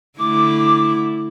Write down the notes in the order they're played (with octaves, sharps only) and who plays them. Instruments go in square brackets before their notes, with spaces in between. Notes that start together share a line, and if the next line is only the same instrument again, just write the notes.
[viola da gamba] D3 A3 E4 [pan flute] D6